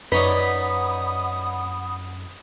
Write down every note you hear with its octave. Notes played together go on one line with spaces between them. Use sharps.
F#2 D#4 B4 C#5 D5 F#5 B5 D#6